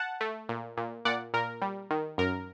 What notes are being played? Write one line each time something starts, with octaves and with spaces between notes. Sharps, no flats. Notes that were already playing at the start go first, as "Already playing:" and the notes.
Already playing: F#5 A5
A3
A#2
A#2
A#2 D5 F#5
A#2 A#4
G3
D#3
F#2 A#4